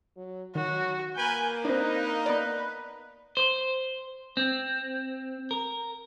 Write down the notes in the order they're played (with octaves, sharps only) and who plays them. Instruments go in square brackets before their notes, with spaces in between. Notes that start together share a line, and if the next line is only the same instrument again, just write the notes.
[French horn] F#3
[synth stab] D#3 [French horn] F#3 [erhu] F#4
[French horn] A#3 [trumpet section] A#4 B4 G#5 [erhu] G6
[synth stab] C4 D4 [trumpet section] D#4 [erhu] B4
[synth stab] B3 D5 [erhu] B4
[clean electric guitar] C5
C4
A#4